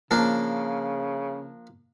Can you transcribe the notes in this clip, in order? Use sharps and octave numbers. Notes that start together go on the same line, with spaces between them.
C#3 F3 A#3 D4